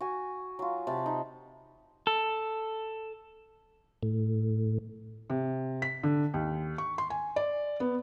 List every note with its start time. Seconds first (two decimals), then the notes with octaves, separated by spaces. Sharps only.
0.01 F#4 G#5
0.59 F#3 F4
0.87 C3 A5 B5
1.06 D#4
2.07 A4
4.03 A2
5.30 C3
5.82 B6
6.03 D3
6.34 D#2
6.78 C#6
6.98 C6
7.10 G#5
7.36 D5
7.80 B3